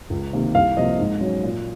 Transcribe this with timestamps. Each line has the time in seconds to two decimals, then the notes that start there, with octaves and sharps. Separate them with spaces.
0.10 C#2
0.33 C3 D#3 A#3
0.55 C2 F5
0.77 C3 F3 A#3 D#5
0.99 G#2
1.21 F#3 C#4
1.43 A#2